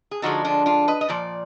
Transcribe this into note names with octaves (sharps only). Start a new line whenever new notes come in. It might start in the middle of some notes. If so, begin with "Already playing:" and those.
G#4
D3 F3 G#3 D#4 F#4
D4 F4
D4 F4
B4 D#5
D#5
A#2 F3 D5